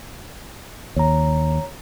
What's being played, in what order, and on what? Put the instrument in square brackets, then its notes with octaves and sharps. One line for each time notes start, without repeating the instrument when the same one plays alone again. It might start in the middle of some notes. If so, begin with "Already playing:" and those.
[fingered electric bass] D#2 [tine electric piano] C#5 A#5